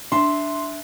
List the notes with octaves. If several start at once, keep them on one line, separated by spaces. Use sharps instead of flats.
D4 E5 C6